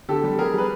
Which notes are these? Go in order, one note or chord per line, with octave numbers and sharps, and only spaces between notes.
D3 G4 A4
G3
G3 G#4 A#4
G3 B4